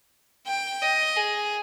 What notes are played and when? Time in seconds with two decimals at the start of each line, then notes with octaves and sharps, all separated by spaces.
0.47 G5
0.82 D#5
1.16 G#4